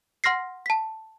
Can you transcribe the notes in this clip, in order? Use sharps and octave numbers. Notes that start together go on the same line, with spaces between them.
F#5 C6 F6 A#6 C7
A5 B6